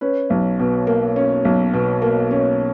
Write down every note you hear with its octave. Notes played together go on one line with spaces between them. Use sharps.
C#4 B4
B1
B2
A#3
C#4
B1
B2
A#3
C#4